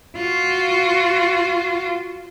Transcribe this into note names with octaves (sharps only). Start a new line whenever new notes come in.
F4 F#4